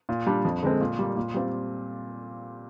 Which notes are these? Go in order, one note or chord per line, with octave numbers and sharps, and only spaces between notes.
A#2
G3 D4
F2
D3 G#3 C4
A#2
G3 A#3
A#2
G3 C4 F4